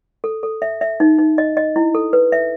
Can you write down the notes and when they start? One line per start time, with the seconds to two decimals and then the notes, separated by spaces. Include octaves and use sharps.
0.24 A4
0.43 A4
0.62 E5
0.81 E5
1.00 D#4
1.18 D#4
1.38 D#5
1.57 D#5
1.76 E4
1.95 A4
2.13 B4
2.32 E5